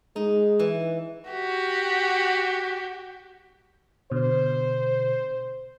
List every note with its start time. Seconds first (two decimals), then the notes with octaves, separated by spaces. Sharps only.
0.16 G#3 D#4
0.59 E3
1.30 F#4 G4
4.12 B2 D3 C5